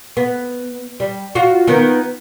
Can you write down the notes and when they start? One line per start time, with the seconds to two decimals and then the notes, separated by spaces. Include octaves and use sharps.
0.17 B3
1.00 G3
1.35 F4 F#4
1.67 D#3 B3